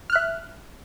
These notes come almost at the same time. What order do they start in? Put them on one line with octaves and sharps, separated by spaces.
F6 F#6 E5